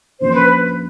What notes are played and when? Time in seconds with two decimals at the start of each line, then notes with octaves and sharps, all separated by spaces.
0.20 C#3 F3 A#3 D4 C5
0.34 B4